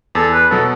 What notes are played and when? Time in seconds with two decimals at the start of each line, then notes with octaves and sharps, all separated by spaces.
0.15 E2 A4
0.33 B4
0.50 B2 F#3 B3 A4